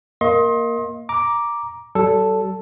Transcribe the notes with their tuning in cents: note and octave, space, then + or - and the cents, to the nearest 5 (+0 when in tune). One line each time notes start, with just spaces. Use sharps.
A#3 +0 D#5 +25 C6 +30
A#5 +10 D6 +0
G3 -45 A4 +0